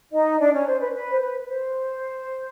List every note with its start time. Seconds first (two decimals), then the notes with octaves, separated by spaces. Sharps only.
0.12 D#4 D#5
0.39 D4 D5
0.53 C#4 C#5
0.67 C5
0.80 B4
0.93 B4
1.11 C5
1.21 B4
1.41 B4
1.48 C5